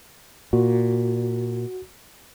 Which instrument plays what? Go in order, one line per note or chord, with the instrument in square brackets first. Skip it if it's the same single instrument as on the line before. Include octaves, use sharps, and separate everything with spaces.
[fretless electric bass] A#2 [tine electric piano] F#4